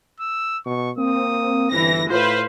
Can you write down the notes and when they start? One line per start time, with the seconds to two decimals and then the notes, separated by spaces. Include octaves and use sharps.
0.20 E6
0.66 B2 C#6
0.98 A#3 C4 D#6
1.72 G1 E3 A#6
2.10 A2 F4 B4 C5 F5